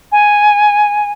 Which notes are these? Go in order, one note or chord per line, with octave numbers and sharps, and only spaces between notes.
G#5